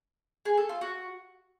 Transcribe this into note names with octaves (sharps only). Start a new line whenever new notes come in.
G#4
A4
F4
F#4